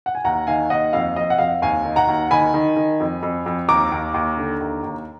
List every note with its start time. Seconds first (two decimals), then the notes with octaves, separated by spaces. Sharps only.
0.06 F#5
0.15 G#5
0.24 D#2 F#5 A#5
0.47 D#3 F5 G#5
0.70 D#2 D#5 F#5
0.93 F2 F5
1.16 F2 D#5
1.30 F#5
1.38 F2 F5
1.62 D#2 F5 G#5
1.85 D#3
1.96 F#5 A#5
2.08 D#2
2.31 D#3 G#5 B5
2.54 D#3
2.76 D#3
3.00 F2
3.23 F2
3.46 F2
3.68 D#2 A#5 D6
3.92 D#2
4.14 D#2
4.37 D3
4.60 D#2
4.83 D#2